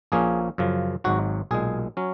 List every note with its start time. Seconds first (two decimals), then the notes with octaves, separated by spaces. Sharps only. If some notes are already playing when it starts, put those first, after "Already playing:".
0.12 A#1 A#2 F3 A#3 C#4 G#4
0.58 F#2 C#3 F3
1.04 G#1 G#2 F#3 F#4
1.51 B1 A#2 G#3 G#4
1.97 F#3 C#4